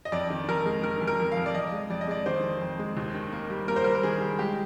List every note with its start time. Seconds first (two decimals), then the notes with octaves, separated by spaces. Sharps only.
0.05 D#5
0.12 F2 D5
0.30 D#3
0.49 F2 A#4
0.66 G#3
0.83 D#3 A#4
1.01 F2
1.07 A#4
1.20 F2
1.32 F5
1.37 F2
1.46 D5
1.55 F2 D#5
1.72 G#3
1.90 F2 D5
2.01 D#5
2.08 G#3 D5
2.26 D#3 C5
2.43 F2
2.62 F2
2.79 G#3
2.97 D#2
3.14 D#3
3.32 A#3
3.50 G3
3.68 A#3 A#4
3.76 C5
3.84 G3 A#4
3.95 A#4
4.03 D#3 G#4
4.21 G3
4.39 G#3 G4